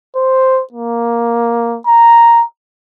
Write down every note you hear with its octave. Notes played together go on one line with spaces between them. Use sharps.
C5
A#3
A#5